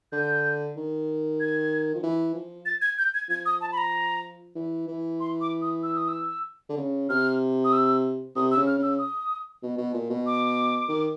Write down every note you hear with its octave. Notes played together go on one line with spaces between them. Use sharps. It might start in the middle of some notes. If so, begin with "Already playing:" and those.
D3 G6
D#3
G#6
F3
E3
F3
A6
G#6
G6
G#6
F3 G#6
D#6
A5
B5
A#5
E3
E3
C6
D6
D#6
E6
D#6
E6
D3
C#3
C3 F6
D#6
E6
C3 D#6
E6
C#3
F6
C#3 E6
D#6
B2
B2
A#2
B2
D6
D#3